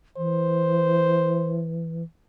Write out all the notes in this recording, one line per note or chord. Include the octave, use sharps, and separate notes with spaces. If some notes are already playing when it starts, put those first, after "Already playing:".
E3 C5